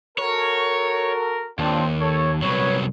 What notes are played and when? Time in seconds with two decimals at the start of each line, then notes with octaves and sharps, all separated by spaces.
0.18 F#4 A4 A#4 C#5
1.59 D#2 C4 D4 F4
2.01 A4 C#5
2.42 C2 F#3 B4 C#5